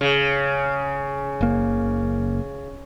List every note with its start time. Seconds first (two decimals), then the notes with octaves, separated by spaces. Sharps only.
0.01 C#3
1.41 F#1 A#3